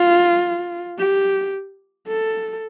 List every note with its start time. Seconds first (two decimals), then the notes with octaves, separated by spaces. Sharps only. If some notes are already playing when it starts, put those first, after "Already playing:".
Already playing: F4
0.99 G4
2.08 A4